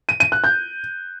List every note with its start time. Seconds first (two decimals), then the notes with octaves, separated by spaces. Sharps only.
0.09 D#7
0.20 D#7
0.32 F#6
0.44 G6